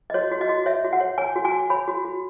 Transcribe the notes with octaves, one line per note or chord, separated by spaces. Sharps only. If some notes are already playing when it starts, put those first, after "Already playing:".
D#5
F#4 C#5
F#4
D#5
F#4
C#5 E5
F#4
F#5
C#5
C#5 G#5
F#4
G#5
F#4
C#5 B5
F#4
F#4